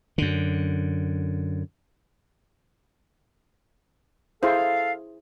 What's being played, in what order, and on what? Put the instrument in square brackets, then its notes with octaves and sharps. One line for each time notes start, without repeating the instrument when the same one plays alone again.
[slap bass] F#2 D3
[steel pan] E4 G#4 C5 [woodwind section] A4 F5